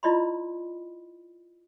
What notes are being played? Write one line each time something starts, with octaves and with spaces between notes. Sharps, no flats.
E4 F4 D5 D#5 B5 C6